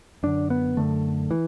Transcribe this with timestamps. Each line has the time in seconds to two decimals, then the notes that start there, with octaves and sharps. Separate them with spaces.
0.23 F#2 D3 D4
0.50 B3
0.77 F#2 D3 A3
1.31 E3